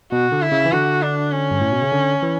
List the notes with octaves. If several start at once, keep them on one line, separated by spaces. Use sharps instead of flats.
B2 F#4
D3
E4
C#3
E3
D3 F#4
D4
C#4
G2
A2
B2
C#3
D3
E3